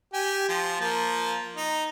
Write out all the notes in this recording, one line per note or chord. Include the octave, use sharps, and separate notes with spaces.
G4 G#5
F3
F3 A#3
D#4